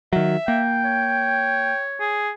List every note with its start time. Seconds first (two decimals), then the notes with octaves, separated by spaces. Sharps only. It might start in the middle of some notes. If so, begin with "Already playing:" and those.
0.13 D#3 F#3 E5
0.48 A#3 G5
0.85 C#5
2.00 G#4